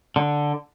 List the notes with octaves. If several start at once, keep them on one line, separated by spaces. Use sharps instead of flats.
D3